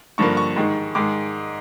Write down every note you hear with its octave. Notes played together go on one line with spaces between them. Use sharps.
G2 D3 F3 A#3 C#6
C#6
G#2 D#3 G#3
G#2 D#3 G#3 D6